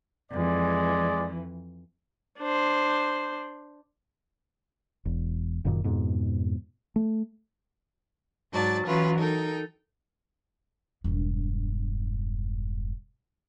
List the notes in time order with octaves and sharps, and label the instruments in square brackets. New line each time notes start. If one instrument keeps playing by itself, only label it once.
[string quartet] F2 E3 [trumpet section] G#3 D5
[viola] D4 C5
[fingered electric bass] E1
F#1 F#2 A#2 D#3
F2 G#2 B2
A3
[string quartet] G#2 F#3 D5 A5
E3 F#3 C#4 F4 B4
D#4 A4 A#4 G5
[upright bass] E1 G2